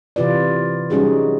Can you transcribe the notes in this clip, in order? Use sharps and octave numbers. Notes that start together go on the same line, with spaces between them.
C3 E3 F4 B4 D5
F#3 G3 C#4 D#4 F#4 G#4